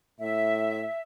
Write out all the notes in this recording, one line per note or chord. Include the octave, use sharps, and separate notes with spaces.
A2 E5